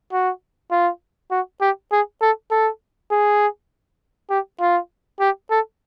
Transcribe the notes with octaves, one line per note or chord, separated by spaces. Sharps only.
F#4
F4
F#4
G4
G#4
A4
A4
G#4
G4
F4
G4
A4